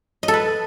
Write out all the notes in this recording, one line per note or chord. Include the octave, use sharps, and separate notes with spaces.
D#5
A4
B4